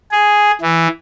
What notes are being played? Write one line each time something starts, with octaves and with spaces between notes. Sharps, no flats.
G#4
E3